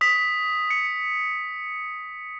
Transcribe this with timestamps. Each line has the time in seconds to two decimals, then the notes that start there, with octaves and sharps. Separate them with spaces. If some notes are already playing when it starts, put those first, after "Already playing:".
0.01 D#6 B6
0.70 C#7